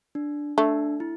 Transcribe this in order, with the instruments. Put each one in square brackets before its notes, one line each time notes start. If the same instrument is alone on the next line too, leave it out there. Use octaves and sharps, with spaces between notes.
[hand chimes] D4
[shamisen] A3 [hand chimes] D4
[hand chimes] E4